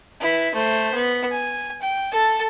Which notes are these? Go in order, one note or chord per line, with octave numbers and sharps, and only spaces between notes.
E4 B4
A3 C5
B3
G#5
G5
A4 A5